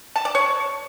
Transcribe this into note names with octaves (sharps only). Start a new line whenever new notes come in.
A5
D5
C#5